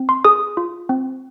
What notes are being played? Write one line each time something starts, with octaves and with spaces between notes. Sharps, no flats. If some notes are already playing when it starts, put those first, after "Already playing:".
Already playing: C4
C6
G#4 D#6
F4
C4